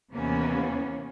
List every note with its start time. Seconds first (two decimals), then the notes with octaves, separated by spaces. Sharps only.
0.12 D#2 C3 E3 A#3 B3 C#4